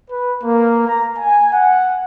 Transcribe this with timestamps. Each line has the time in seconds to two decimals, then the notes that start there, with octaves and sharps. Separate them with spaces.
0.10 B4
0.43 A#3
0.87 A#5
1.18 G#5
1.52 F#5